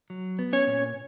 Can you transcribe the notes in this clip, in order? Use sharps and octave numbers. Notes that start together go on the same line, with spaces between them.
F#3
B3
C#4 C#5
A#2